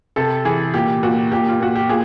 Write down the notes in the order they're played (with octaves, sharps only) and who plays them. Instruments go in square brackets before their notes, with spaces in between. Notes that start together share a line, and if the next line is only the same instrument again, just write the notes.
[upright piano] C3 A4
E3 G#4
A#2 G4
A#2 F#4
A#2 G4
F4
A#2 F#4
G4
A#2 G#4